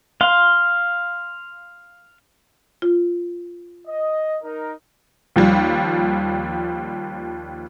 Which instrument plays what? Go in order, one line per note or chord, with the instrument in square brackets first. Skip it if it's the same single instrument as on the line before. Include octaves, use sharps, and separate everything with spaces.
[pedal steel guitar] F5 C6
[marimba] F4
[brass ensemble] D#5
D#4 A#4
[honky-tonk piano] D#2 F3 G3